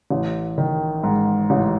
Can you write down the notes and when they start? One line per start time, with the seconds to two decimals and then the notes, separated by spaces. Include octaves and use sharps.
0.10 A1
0.58 D#3
1.03 G#2
1.50 A1